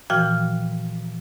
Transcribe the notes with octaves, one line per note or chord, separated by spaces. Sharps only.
A#2 E3 F3 F#4 G5 F6